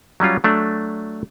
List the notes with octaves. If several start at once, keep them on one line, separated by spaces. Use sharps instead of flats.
F#3 G3 C#4 F4
F#3 A3 D4